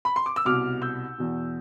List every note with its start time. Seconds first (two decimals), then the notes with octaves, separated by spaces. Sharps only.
0.05 B5
0.16 C6
0.26 D6
0.36 E6
0.45 C2 B2 D6 F6
0.82 E6 G6
1.18 E2 B2